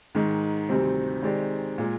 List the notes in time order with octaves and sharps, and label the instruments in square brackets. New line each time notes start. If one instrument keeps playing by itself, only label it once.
[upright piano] G#2 D#3 G#3
D2 C3 D#3 G3 C4
D#3 G#3 C4 G4 D5
A#2 G#3